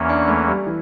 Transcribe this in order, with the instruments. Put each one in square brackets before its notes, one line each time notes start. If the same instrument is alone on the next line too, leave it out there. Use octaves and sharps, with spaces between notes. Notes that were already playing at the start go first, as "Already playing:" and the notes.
Already playing: [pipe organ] E2 E3 A#3 C#4
[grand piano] D4
A3
G3
E3